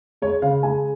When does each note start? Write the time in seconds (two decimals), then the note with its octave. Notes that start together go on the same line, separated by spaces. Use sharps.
0.22 G#3 C#5
0.42 C#3 F5
0.63 G#3 G#5